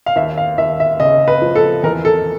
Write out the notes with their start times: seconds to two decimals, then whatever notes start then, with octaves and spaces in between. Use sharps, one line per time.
0.06 F5
0.16 D#2 E5
0.38 F5
0.58 D#2 E5
0.80 E5
1.00 C#3 D#5
1.28 B4
1.42 F3
1.55 A4
1.83 E2 A#4
2.05 A4